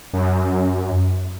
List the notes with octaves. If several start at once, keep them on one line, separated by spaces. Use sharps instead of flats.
F#2